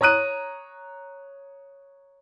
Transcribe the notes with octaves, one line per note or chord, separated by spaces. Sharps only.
C#5 A#5 D#6 F#6 D#7